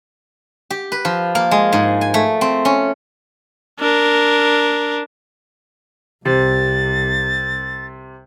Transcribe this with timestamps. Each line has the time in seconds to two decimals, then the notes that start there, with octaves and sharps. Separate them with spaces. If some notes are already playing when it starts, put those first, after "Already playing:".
0.70 G4
0.92 B4
1.05 F3
1.35 A#3
1.51 G#3
1.73 G#2
2.01 G#5
2.14 A3
2.41 C4
2.65 C#4
3.80 D4 A#4
6.25 C2 C3 A6